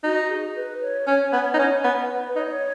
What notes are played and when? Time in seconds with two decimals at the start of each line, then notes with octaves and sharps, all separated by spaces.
0.03 D#4 F#4
0.29 G#4
0.56 B4
0.82 C#5
1.07 C#4
1.33 B3
1.54 D#4
1.59 C#4
1.84 B3
2.10 B4
2.35 D#4 D#5
2.39 C#5